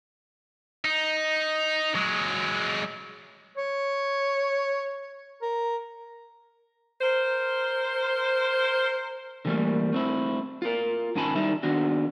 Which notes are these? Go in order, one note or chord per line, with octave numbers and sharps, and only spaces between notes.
D#4
F#3 G#3
C#5
A#4
A#4 C5
D3 E3 F3 G3 A3 A#3
A3 C4 E4
F4 A#4
G#2 D#3 C#4 G#5 A5 B5
D#3 G3 D#4 E4 E5 A#5
D#3 B3 D4 F#4